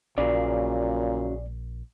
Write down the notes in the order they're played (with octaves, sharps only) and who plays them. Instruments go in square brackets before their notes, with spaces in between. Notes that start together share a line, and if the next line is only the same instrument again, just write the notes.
[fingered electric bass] A#1 [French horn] A#2 [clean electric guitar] C#3 F#3 G#4 [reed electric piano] D5